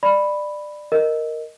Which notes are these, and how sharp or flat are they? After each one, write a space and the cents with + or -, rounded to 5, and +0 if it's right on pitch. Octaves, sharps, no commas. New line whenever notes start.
D5 +20 B5 +0
A#4 +0 D#5 +0